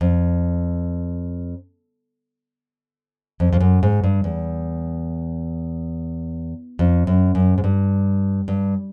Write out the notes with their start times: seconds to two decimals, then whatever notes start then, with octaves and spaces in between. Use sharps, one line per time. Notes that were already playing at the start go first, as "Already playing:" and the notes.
0.01 F2
3.40 F2
3.53 F2
3.60 F#2
3.83 G#2
4.04 G2
4.24 E2
6.79 F2
7.07 F#2
7.35 F#2
7.58 G#2
7.64 G2
8.48 G2